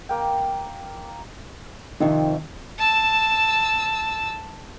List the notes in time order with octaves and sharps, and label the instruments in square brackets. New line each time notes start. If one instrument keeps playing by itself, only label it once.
[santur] A#3 G5
[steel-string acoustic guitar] F2 C3 [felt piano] D#3
[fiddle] A5 E6